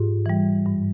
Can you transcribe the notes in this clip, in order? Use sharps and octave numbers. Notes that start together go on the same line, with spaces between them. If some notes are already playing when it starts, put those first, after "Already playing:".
Already playing: G#2 F4 G4
E3 G3
G2